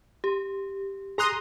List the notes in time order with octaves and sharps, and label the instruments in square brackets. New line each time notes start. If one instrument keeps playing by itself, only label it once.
[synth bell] G4
[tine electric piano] G#4 F#6 [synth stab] A#5 C6 D#6